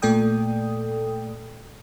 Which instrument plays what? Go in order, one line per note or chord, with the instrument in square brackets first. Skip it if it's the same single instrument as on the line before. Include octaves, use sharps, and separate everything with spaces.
[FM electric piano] A#2 A3 A4 D5 G5 D#6